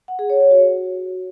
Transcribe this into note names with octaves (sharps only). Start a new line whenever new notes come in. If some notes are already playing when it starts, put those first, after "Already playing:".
F#5
G#4
C#5
C#5
F#4